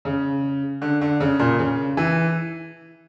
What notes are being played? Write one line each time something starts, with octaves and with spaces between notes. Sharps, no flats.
C#3
D3
D3
C#3
A#2
C#3
E3